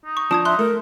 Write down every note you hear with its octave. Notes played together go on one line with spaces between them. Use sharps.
D#4
C#6
F3 D4 A5 D#6 G#6
E5 C6 F#6
A3 A#4